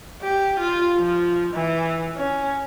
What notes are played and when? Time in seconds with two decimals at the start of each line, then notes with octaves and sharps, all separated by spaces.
0.22 G4
0.60 F4
0.98 F3
1.53 E3
2.17 C#4